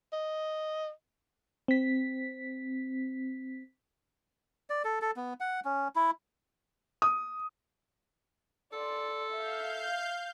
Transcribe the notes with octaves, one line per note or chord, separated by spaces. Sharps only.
D#5
C4 B6
D5
A4
A4
B3
F#5
C#4
E4
D#6
A4 D5 C6
E5 F5 G6